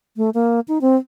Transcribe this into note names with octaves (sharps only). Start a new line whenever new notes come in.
A3
A#3
D#4
C4